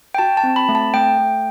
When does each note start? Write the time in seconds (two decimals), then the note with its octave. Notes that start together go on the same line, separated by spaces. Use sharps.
0.15 G5
0.18 F#4 A5
0.37 A5
0.44 C4
0.56 B5
0.69 A3
0.75 A5
0.94 A3 G5
1.19 A3